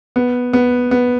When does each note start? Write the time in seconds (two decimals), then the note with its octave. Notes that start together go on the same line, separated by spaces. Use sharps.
0.16 B3
0.53 B3
0.91 B3